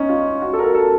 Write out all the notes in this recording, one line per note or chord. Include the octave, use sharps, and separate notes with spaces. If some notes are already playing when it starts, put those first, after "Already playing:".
Already playing: C#4 D#4
F4
F#4
A4
A#4
A4
A4